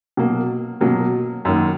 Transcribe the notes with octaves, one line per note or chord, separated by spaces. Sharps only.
B2 F#3 A#3
B2 F#3 A#3
F#2 D#3 A#3